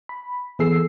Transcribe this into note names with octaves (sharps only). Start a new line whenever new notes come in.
B5
E3 B3 G#4 A4 E6 C7